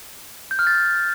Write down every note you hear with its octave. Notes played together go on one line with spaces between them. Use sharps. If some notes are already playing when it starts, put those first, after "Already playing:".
G6
F6
A6